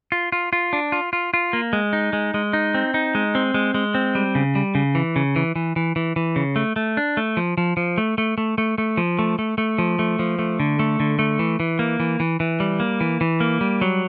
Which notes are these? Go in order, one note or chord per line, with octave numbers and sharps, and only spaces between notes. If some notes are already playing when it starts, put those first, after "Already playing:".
F4
F4
F4
D4
F4
F4
F4
A#3
G#3
D#4
G#3
G#3
D#4
C4
D#4
G#3
C4
G#3
G#3
C4
G3
C#3
G3
C#3
E3
C#3
E3
E3
E3
E3
E3
C#3
A3
A3
D4
A3
F3
F3
F3
A3
A3
A3
A3
A3
F3
A3
A3
A3
F3
A3
F3
A3
D3
A3
D3
A3
E3
E3
A#3
E3
E3
E3
G3
A#3
E3
E3
A#3
G3
F#3